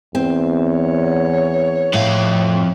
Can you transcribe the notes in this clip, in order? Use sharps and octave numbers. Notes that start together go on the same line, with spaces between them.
E2 C4
C#5
F2 A2 F5